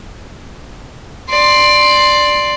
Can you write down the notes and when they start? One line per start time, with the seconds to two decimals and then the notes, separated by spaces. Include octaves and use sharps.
1.30 D5 C6